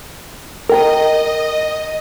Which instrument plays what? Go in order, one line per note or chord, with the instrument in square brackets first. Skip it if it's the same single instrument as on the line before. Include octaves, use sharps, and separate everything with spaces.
[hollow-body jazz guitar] A#4 G5 A#5 [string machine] D#5